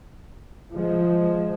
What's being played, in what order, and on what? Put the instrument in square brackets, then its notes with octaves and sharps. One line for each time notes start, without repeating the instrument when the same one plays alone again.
[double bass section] F3 G#3